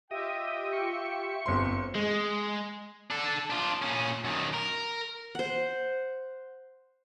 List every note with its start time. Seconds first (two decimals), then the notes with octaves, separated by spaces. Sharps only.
0.11 F4 G4 D#5 E5 G5
0.73 C#6
1.46 G1 C4 C6
1.95 G#3
3.10 D4 A4
3.50 D4 F4
3.82 A#2 C#4
4.24 F#2 D#3
4.54 A#4
5.35 C5 F#5